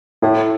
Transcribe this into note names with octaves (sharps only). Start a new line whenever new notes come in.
A2 E4